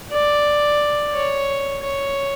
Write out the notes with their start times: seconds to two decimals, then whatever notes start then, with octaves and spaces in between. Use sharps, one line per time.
0.12 D5
1.14 C#5
1.83 C#5